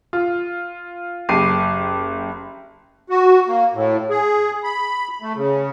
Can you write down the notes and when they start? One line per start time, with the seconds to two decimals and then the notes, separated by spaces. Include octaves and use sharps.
0.13 F4
1.29 F#1 G4 D6 C7 D#7
3.10 F#4
3.48 A#3
3.73 A2
4.10 G#4
4.64 B5
5.22 A3
5.36 C#3